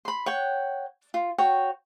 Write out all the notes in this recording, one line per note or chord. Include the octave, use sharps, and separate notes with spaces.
B5 C6
C#5 F#5 G5
F4
F#4 C#5 G5